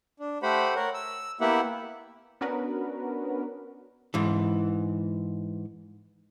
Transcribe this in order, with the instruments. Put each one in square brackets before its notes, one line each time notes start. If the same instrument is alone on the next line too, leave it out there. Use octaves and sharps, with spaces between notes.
[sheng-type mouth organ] D4
A3 G4 C5 F#5 B5
A#4 C#5 F#5
E6
A#3 B3 E4 G4 E5 F#5
[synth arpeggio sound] B3 C#4 D4 F#4 A#4 B4
[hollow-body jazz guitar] G#2 E3